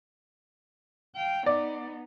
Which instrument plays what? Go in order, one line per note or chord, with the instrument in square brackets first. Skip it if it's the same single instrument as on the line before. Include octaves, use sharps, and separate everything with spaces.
[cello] F5 G5
[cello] B3 D#4 [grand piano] D5